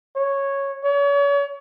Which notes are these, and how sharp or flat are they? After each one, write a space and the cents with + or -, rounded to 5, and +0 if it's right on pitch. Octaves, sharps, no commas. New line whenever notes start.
C#5 -5
C#5 +35